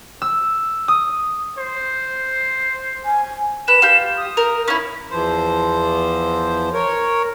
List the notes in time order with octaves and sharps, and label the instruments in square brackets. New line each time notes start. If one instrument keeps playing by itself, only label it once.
[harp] E6
D#6
[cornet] C5
[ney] G#5
[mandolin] B4 [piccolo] E7
[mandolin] F4 G4
[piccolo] D#6
[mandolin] A#4
C#4 E4
[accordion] E2 E3 F3 C5
A#4 C#5